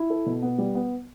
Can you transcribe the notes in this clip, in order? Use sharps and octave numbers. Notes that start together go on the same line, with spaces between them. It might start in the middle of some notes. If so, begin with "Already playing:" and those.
Already playing: E4
A4
B2
B3
G3
B3